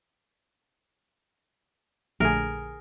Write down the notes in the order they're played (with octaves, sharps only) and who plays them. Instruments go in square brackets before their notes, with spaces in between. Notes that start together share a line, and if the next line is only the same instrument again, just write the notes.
[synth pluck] A#1 D3 A3 [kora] G#4 A#4